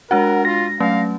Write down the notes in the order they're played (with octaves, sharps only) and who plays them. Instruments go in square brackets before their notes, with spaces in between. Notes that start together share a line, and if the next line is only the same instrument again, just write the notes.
[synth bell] G#3 D4 F#4 [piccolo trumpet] A#4 [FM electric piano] F#5
[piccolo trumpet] F4 [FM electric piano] A#6
[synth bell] F#3 A3 C#4 [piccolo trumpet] F5